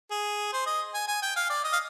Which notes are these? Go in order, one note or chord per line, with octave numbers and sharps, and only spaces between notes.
G#4
C5
D#5
G#5
G#5
G5
F5
D5
D#5
F5